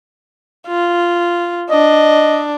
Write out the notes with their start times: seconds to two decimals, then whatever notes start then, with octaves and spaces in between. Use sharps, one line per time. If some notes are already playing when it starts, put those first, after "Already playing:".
0.68 F4
1.70 D4 D#5